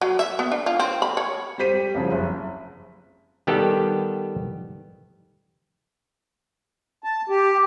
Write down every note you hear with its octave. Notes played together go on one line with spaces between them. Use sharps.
F#3
E5
B3
D4
F4
C4
B5
C#5
G3 G4 C5 B6 D#7
G3
C2 C#3 F3
F#1
D#3 G3 B3 G4 A4
A5
G4